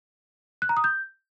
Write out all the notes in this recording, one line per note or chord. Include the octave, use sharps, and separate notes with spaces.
F#6
A#5
D#6
G6